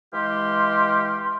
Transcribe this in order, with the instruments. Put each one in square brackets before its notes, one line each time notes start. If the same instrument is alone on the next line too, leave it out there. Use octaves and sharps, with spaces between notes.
[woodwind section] E3 G#3 G4 F5 C6